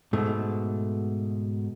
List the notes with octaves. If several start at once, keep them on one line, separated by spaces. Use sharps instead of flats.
G#2 B2 A3